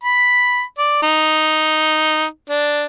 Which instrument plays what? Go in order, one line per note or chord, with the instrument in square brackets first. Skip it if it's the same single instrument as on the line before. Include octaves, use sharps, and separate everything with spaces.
[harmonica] B5
D5
D#4
D4